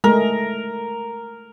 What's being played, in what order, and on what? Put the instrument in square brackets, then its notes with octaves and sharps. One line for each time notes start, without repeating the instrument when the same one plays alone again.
[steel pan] G#3 A3 [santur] A#4